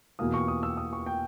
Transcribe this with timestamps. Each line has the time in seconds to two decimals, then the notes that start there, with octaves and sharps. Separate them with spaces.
0.19 E2 B2 A#3 D#6
0.34 C#6
0.48 D#6
0.63 E6
0.77 D#6
0.93 C#6
1.06 G5